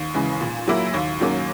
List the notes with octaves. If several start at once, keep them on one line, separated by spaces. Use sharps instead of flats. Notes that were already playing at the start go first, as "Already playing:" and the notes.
Already playing: D#2
C#3 E3 G#3
A#2
F#3 A#3 E4
D#2
D#3 F#3 A#3 C#4